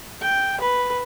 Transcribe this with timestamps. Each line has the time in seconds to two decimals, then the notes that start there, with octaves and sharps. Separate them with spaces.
0.21 G5
0.61 B4